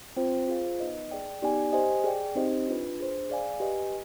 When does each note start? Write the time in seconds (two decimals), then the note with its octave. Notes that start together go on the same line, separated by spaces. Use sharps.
0.16 C4 F4 C5 G5
0.48 F4 G#4 C5 F5
0.80 B3 D#4 B4 D#5
1.11 G#4 D5 G5
1.42 B3 D#4 G4 D5 G#5
1.73 G4 C5 D#5 G#5
2.04 G#4 D5 G5
2.35 C4 D#4 G4 C5 D#5
2.67 D4 F4 B4
2.98 D4 G#4 C5
3.30 G#4 D5 F5 G#5
3.60 G4 B4 D#5 G#5